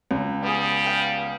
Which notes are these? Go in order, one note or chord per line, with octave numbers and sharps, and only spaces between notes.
C#2
G3 B3 G#4
F5 G5 B5